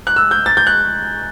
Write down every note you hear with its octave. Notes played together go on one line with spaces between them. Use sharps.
F#6
E6
G6
A6
G6
F#6